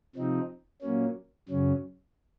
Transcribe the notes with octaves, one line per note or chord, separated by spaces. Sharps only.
C3 F3 C4 D#4
A#2 F#3 A#3 C#4
F#2 C#3 F#3 C#4